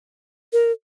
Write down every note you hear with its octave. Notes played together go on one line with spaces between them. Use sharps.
A#4